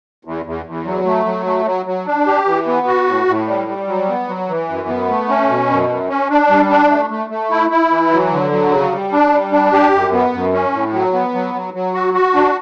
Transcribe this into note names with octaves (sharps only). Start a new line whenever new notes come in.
E2
E2
E2
F#3
A3
F#3
A3
F#3
F#3
D4
G4
E3
B3
F#4
A2
A2
G3
G3
F#3
B3
F#3
E3
F#2
B3
A3
C#4
B2
F#2
F#2
C#4
D4
G3
D4
A3
A3
A3
E4
E4
E3
F#3
D3
F#3
C#3
G3
D4
G3
D4
G4
F#2
B3
F#2
C#4
A2
F#3
B3
F#3
F#3
F#3
F#4
F#4
D4